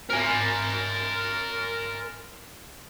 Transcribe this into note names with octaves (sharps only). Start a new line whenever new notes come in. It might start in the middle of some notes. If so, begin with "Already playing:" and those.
A#4 G#5